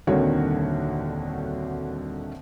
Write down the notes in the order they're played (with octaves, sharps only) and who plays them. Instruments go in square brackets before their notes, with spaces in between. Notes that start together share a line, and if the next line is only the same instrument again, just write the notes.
[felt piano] D#1 C2 D3 D#3 F#4 C#5